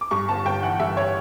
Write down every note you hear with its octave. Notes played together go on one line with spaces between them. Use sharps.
D6
G2 C#6
G1 A5
G1 G5
E3 F#5
G2 E5
C#5